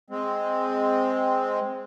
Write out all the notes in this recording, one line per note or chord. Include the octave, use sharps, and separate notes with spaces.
G#3 C4